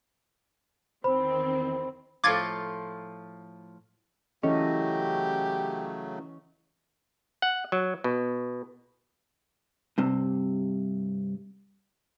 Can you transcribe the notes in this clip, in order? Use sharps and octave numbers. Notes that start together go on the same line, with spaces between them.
E2 D#3 C4 C5 B5
A2 F3 F4 D6 G#6 A6
C#3 E3 F#3 A3 C#4 G4 A4 D#5
F#5
F#3
B2
G2 C3